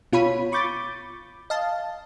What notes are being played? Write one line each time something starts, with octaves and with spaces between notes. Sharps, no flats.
B2 F4 C#5 B5 D#7
B5 C#6 D6 G6 A6
D#5 F5 A5